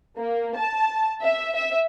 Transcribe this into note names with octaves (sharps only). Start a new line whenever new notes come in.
A#3
A5
E5
E5